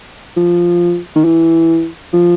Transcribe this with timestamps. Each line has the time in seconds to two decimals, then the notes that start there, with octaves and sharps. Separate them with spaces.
0.36 F3
1.16 D#3
1.25 E3
2.13 F3